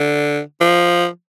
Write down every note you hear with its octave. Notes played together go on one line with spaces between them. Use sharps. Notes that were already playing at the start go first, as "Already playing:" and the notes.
Already playing: D3
F3